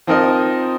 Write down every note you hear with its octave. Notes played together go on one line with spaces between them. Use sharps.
F3 C4 D#4 A#4 D#5